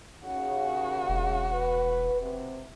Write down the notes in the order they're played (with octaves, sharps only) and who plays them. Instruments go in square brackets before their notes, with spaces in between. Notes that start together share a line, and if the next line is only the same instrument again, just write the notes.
[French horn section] D#2 C#3 [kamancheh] F#4
[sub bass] E1
[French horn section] B4
C3